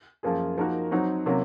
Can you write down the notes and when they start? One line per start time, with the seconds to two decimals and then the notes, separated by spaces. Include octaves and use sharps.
0.23 F#2 F3 A#3 F4 G#4
0.57 F3 A#3 D#4 F#4 A#4
0.91 F#3 C4 D#4 F#4
1.26 C3 F#3 A#3 C#4